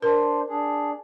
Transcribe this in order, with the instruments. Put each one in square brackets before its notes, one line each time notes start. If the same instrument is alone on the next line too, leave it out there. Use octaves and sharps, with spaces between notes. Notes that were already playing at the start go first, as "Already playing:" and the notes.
[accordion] D4 C5 [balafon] A#4
[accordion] D4 G#4